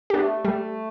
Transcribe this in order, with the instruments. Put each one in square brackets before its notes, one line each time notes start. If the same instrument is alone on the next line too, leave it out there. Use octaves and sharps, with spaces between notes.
[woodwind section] B3 [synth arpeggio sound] D4 G4
[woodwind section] A3
[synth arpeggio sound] G3 [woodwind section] A3